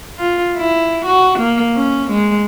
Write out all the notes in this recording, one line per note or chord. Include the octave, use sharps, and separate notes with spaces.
F4
E4
F#4
A#3
C#4
G#3